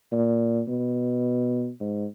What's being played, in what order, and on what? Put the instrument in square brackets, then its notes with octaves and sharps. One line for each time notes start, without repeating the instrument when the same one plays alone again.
[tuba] A#2
B2
G#2